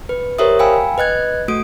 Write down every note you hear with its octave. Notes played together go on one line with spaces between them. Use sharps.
B4
G4 A#4 C5 C#5 E5 D#6
F5 G5 G#5 B5 E6
B4 D#5 F#6 G#6
A3 F#4 D#6 D7